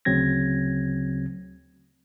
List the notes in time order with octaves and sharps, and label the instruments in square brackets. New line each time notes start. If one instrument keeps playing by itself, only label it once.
[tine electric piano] D2 C#3 F#3 C4 G#6 A#6